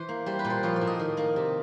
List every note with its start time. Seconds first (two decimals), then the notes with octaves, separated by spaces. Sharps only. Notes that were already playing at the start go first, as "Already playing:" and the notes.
Already playing: E3 C5
0.09 A#3
0.26 G3 C5
0.39 B4
0.45 A#2
0.50 C5
0.63 F3 C#5
0.76 D5
0.81 A2
0.87 D#5
0.99 D#3
1.17 A#3
1.36 C3